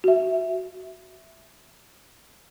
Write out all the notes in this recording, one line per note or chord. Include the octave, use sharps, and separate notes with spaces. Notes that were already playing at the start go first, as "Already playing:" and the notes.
F#4 E5